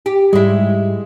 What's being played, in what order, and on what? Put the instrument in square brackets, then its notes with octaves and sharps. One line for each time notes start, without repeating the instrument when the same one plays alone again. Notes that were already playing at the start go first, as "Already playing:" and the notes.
[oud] G4
[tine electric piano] G#2 G3 [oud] G#3 E4